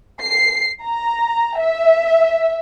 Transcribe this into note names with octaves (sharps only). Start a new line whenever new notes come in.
C7
A#5
E5